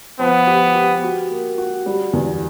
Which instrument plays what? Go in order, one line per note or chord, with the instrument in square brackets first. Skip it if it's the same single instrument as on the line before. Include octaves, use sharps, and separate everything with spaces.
[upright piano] F3 [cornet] B3
[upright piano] G4
G4
F#4
A#3
F#4
G3
E2